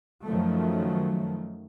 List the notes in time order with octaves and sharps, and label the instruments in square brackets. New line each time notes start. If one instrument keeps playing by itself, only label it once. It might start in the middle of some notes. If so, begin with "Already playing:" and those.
[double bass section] F#2 D#3 F3 F#3 A3